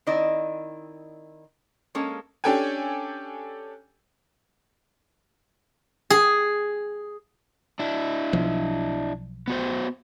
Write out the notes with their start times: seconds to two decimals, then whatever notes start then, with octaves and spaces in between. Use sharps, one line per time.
0.07 D#3 C4 E4 D5 D#5
1.95 G#3 A#3 C#4 A4
2.44 C#4 D4 G4 A4 G5 G#5
6.10 G#4
7.79 D4 E4
8.33 B1 F3
9.48 B3 F#4 C5